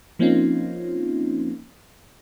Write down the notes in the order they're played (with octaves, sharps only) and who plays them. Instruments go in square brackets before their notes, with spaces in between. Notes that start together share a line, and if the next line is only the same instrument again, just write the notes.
[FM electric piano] F3 A#3 C4 C#4 D#4 F4